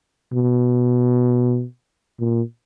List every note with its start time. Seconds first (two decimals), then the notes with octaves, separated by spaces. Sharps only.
0.33 B2
2.20 A#2